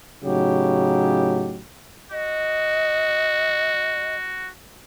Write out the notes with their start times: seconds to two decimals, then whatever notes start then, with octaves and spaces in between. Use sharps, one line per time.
0.24 A2 C#3 F#3 D#4 G4
2.12 F#4 D#5